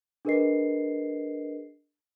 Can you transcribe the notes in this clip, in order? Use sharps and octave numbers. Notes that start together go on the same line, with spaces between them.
D4 G#4 A#4 B4 D#5 C7